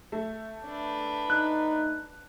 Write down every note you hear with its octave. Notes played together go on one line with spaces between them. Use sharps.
A3
D4 B4
D#4 F#6